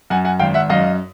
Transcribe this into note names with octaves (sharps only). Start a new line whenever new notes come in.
F#2 F#5 G#5
F#5 G#5
G#1 F5 G5
E5 F#5
F#2 D#5 F5